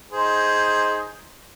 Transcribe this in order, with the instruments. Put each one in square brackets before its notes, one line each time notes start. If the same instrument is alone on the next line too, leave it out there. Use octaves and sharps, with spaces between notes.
[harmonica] D#4 G#4 C5